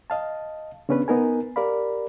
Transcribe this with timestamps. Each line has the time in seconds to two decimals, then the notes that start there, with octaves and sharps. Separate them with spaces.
0.10 D#5 F5 A5
0.89 C#3 B3 C#4 D4 B4
1.08 B3 D#4 A#4 G#5
1.56 G4 A#4 D5 F5 B5